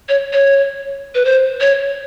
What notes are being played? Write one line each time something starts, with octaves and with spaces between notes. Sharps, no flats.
C#5
C#5
B4
C5
C#5